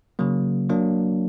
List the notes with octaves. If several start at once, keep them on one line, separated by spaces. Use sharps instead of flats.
C#3 F#3 A#3
F#3 A#3 D4